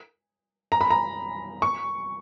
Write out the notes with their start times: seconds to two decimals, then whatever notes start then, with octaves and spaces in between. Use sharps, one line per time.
0.72 A#5
0.81 B5
0.90 A#5
1.62 C#6